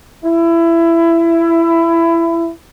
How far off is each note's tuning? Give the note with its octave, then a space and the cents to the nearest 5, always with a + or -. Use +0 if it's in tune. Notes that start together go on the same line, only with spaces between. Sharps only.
E4 +20